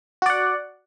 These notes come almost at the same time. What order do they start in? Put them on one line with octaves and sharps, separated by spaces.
F#4 D5 F#5